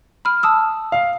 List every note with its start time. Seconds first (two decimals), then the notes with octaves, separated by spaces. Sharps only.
0.25 B5 F6
0.43 A5 D#6 E6
0.92 F5